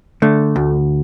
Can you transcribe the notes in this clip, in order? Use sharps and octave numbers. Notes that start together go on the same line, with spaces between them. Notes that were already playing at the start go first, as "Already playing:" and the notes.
D3 A3
D2